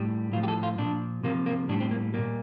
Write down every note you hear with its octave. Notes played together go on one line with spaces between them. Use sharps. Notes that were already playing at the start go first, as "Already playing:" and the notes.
Already playing: A2 G3
A2 F3 F4
G4
A4
F4
A#2 F3 D4
C3 F3 A#3
A#3
A2 G3 D4
C4
A#3
A#2 G3 A#3